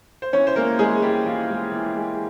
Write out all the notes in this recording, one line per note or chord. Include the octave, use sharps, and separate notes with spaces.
C5
E3 C#4 C#5
C5
G#3 A#3 A#4
E3 G#3 G#4
G3 G#3 G4
E3 F4
G#3
E3
G#3